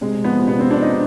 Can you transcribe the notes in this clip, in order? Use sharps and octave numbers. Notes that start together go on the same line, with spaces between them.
C3 G#3
F3 B3
C3 B3
C4
F3 D4
D#4